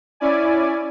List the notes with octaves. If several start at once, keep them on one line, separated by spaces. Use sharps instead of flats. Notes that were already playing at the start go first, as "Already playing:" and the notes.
C#4 E4 D5 G#5